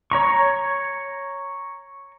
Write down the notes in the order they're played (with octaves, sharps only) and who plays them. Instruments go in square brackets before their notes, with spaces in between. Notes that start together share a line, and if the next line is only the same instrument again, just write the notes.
[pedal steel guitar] C#5 A#5 C#6